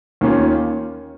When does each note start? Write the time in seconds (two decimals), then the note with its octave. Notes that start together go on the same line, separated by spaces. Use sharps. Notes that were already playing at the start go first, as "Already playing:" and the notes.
0.21 D#2 D#3 A#3 C#4 F4